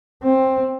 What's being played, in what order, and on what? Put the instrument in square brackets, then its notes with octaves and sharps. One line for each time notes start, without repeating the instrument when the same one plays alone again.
[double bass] C4